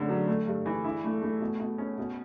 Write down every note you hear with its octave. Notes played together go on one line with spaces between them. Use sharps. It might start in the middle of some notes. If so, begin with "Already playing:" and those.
Already playing: A2 D3 C#4
F#3
A3
G2
E3
E4
A3
A3
B2
B2
C#4
B2